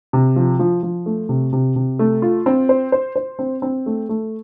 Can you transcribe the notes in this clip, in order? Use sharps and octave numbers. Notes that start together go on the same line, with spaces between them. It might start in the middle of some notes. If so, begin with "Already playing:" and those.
C3
F3
F3
F3
A3
C3
C3
C3
A3
F4
C4
C5
C5
C5
C4
C4
A3
A3